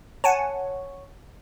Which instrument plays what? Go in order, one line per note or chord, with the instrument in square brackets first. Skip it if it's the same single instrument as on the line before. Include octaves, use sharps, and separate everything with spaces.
[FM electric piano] C#5 [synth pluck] F#5 G#5 A5